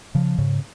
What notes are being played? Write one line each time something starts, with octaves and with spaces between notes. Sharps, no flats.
C#3 F3
G#2 C#3